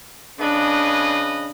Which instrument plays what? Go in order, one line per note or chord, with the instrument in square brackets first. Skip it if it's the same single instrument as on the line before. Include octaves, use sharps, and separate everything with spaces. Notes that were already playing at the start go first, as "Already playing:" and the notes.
[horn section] C#3 B4 D#5 [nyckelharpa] D4